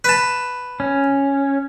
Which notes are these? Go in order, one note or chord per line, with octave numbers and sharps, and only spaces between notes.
B4 A5
C#4